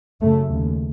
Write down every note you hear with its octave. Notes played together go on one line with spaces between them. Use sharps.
F#2 C#3 A3
D#2 C#3